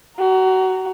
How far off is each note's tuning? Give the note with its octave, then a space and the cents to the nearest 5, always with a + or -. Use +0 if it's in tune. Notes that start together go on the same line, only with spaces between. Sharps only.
F#4 +25 A#5 +0